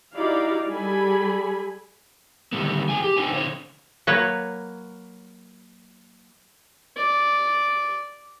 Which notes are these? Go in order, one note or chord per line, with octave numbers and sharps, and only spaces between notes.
D#4 E4 F#4 G4 D5 F5
G3 G#4 A4 G#5 B5
D3 D#3 G3 A3 B3
F2 G#4 G5 G#5
G4
D4 D#4 C5 G5 G#5
D3 C5 C#5
F#3 A#3 B4 C#5
D5